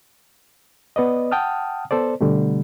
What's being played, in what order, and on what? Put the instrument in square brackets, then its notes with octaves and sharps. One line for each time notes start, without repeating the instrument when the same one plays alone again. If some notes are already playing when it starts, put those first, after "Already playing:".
[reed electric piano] B3 B4 D5 D#5
F#5 G5 A5 D#6 F6
B3 A4 C5 D5
B2 D3 G3 A3